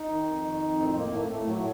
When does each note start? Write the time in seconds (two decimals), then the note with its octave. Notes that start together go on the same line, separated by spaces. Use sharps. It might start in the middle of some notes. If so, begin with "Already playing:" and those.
Already playing: D#4
0.10 D#3
0.27 F2
0.44 D#3
0.62 F2
0.79 A2 C4
0.96 A2 A#3
1.13 A2 A3
1.31 A2 A3
1.47 A2 F#3